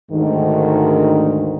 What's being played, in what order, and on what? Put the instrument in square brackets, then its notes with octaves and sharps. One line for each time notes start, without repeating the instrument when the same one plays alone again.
[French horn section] D2 G#2 D#3